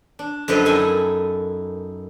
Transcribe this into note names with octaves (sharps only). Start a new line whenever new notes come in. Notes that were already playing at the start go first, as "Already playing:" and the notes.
D4
F#2 D3 F3 B4 D#5 G5
D#4 E4 A4 A#4 G#5